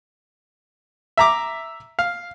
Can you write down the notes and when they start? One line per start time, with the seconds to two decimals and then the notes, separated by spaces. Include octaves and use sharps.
1.17 E5 A#5 D6
1.99 F5